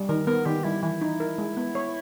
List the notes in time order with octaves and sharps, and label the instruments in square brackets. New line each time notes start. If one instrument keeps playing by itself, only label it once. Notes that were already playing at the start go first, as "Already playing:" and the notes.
Already playing: [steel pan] G3
[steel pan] D#3 [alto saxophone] A#4
[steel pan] B3 [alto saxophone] A#4
[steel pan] D#3 [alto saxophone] G4
[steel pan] G3 [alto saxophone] E4
[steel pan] E3 [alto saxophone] E4
[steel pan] D#4
A#4
G#3
B3
C#5